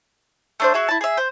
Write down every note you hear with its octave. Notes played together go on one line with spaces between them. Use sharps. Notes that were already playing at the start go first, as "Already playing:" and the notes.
A3 D4 C5
F#4 G#4 E5
E4 A5
G#4 E5
C5